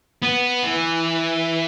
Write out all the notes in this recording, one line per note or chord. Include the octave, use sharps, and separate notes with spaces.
B3
E3